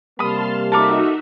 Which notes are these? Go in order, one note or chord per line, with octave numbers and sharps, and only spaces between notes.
C3 G3 A#3 A5 B5 C6 D#6 F6
D#4 F#4 A4 A#4 E5 D6